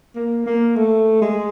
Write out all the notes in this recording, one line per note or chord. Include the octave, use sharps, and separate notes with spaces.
A#3
A#3
A3
G#3